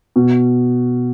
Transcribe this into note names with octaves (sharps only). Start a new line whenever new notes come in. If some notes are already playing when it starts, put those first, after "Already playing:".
B2